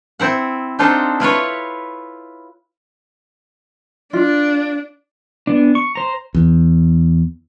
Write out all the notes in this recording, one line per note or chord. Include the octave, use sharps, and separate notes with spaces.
C4 E4 F#5
C4 D4 D#4 F4 A4 C5
E4 F4 B4 C#5
D4 F4
B3 D4
C#6
C5 A#5
E2